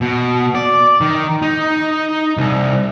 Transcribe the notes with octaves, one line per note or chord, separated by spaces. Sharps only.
B2
D5
D#3
D#4
C2